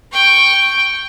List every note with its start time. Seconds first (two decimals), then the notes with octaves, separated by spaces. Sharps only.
0.12 G5 C#6